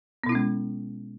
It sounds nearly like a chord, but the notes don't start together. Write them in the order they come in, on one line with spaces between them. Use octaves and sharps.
B3 B2 E4 C#4 G#3